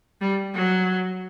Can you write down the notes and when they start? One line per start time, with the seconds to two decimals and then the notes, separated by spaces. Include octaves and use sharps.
0.21 G3
0.54 F#3